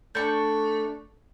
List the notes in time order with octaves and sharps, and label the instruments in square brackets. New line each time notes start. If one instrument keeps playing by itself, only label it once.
[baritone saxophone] A3 [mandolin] D4 C#6 [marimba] G6